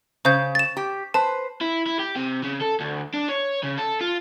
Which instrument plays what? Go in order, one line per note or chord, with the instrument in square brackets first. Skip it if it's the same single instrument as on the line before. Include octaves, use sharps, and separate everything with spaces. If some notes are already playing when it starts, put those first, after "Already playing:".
[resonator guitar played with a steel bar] C#3 [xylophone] C5 G6
[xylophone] A6 E7
[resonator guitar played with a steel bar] G4
[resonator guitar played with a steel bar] B4 C5 [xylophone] A5
[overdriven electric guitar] E4
E4
G4
C3
C#3
A4
D2
D4
C#5
C#3
A4
F4